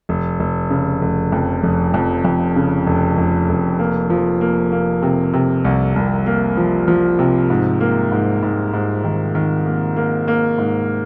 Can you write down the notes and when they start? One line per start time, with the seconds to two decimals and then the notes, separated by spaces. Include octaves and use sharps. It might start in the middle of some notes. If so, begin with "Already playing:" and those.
0.09 F1
0.40 F1
0.70 C#3
1.02 F1
1.32 F2
1.63 F1
1.94 F2
2.25 F2
2.56 C#3
2.87 F1
3.18 F1
3.49 F1
3.79 A#3
4.10 F3
4.41 A#3
4.72 A#3
5.02 C3
5.33 C3
5.64 C2
5.96 C2
6.26 A#3
6.57 F3
6.88 F3
7.19 C3
7.50 G#2
7.80 A#3
8.12 G#2
8.43 G#2
8.73 G#2
9.04 D#3
9.35 D#3
9.66 A#3
9.96 A#3
10.28 A#3
10.58 G#2